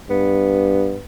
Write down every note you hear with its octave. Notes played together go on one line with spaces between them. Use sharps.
G2 B3